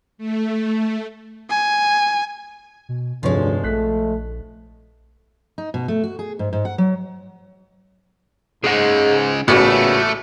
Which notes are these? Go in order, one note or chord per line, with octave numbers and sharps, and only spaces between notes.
A3
G#5
B2
F1 D2 G2 F3 G#3 C#5
A#1 A3 F#6 B6
D#4
B2
A3
F#4
G#4
G#2
G#2
F#5
F#3
G#2 C#3 G#3 G#4 F#5
A1 A#2 C#3 A3 B3 F#4